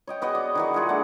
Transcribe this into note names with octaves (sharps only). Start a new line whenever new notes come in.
C#5 D#5 G5
B3 F#4 G#4 D#5
D5
D#3 E3 F#4
F4 F#4 G#4 F#5
A3 D4